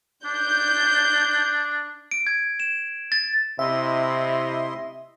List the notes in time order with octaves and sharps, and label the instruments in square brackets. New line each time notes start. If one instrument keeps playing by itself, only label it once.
[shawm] D4 [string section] G6
[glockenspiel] D7
G#6
E7
A6
[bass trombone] C3 [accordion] E4 D#5 C6 [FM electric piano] E5